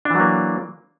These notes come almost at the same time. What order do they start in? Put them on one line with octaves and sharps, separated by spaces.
D4 E3 F#3 A#3